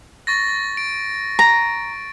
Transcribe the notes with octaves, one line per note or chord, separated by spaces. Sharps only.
C#6 A6 A#6
D7
A#5